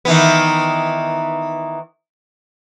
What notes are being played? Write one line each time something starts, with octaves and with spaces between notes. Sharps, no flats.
D#3 E3 B3